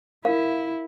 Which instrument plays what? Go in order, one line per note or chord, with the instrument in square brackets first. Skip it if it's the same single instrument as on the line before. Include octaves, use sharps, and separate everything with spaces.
[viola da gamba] E4 [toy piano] A#4 F5